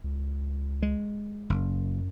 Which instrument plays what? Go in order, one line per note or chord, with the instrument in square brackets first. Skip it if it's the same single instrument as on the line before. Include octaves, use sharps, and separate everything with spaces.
[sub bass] C#2
[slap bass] G#3
[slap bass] F#1 [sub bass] F#2